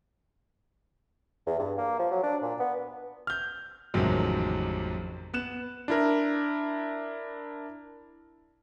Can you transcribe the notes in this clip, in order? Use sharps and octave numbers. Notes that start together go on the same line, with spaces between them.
E2
G2
A#3
F3
F#3
D4
A#2
B3
F6 G6
A1 F2 C3 D#3 F#3 G#3
B3 F#6 E7
D4 E4 A#4